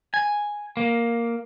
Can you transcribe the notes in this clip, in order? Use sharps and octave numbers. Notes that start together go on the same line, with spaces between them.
G#5
A#3